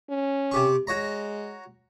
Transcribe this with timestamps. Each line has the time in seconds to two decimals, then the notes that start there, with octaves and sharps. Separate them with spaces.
0.10 C#4
0.51 C3 G4 C#6
0.87 G#3 F#4 C#5 A#5